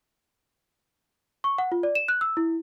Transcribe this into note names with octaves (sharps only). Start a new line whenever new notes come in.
C#6
F#5
F4
D5
E7
F#6
E6
E4